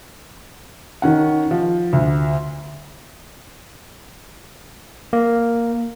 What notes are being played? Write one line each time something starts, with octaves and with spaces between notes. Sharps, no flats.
D#3 C#4 F#5
F3
D2
A#3